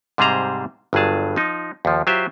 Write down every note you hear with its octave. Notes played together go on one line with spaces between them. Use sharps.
G#2 C3 G3 G#4 C5 A#5
G1 G2 F#3 G#4 A5
F3 D#4
D#2 F3
F#3 F4 G4 C5 E5